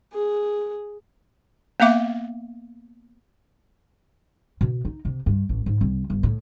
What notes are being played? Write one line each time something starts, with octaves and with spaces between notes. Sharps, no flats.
G#4
A#3 B3 E5 F5 D6
B2
D#4
C3
G2
A1
G#2
C2
G1
A2